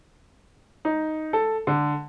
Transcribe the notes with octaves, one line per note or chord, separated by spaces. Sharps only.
D#4
A4
D3